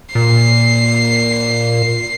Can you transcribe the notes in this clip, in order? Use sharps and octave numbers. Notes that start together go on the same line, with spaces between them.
A#2 C7